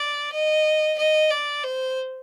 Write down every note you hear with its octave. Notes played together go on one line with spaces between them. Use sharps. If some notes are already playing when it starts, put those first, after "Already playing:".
Already playing: D5
D#5
D#5
D5
C5